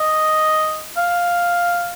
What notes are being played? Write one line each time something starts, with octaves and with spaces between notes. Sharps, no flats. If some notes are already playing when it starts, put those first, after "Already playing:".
Already playing: D#5
F5